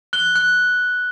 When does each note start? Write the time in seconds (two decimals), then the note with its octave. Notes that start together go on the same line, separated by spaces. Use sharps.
0.13 F#6 G7
0.36 F#6